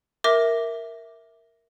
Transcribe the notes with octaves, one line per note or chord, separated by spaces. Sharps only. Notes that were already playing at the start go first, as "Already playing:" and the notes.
A#4 E5 D6 A#6